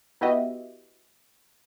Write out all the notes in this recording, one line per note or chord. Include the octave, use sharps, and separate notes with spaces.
B3 E4 F#4 G4 D#5 E5